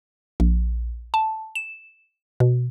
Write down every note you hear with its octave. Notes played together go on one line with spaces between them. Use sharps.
A#1
A5
E7
B2